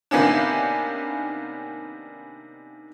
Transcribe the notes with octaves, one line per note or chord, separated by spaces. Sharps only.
C3 D#3 A#3 B3 C#4 D4